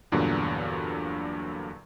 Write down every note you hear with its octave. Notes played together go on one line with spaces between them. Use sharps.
E2 G2 A#2 D3 F#3